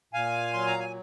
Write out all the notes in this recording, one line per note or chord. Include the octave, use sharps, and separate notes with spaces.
A#2 F5 G#5
F#3 C6
A#5
G#5